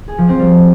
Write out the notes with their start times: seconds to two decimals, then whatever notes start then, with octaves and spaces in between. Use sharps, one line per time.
0.08 G#4
0.18 F3
0.29 C4
0.39 G3